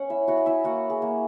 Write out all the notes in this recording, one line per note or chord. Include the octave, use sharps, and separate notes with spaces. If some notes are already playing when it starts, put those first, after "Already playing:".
Already playing: C#4 F#5
E4 E5
E4 F#4 F#5
D#5
E4 E5
A#3 F#4 F#5
G#4
A#3